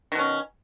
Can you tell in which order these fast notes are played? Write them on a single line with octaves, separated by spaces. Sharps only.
D#3 B2 C#4